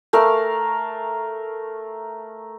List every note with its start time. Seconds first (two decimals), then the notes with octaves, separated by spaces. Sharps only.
0.13 A3 A#4 F5